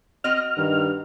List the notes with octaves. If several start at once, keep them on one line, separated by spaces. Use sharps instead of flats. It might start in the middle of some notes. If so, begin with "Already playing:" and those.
C4 F#4 D#5 F6
G2 D#3